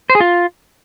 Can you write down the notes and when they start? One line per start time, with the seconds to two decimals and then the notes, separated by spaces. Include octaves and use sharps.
0.10 C5
0.15 G#4
0.20 F4